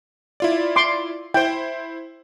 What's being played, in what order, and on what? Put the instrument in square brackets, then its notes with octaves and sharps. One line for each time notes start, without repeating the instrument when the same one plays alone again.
[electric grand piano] E4 F4 D5
[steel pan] C6 D6
[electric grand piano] E4 C5 [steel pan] G5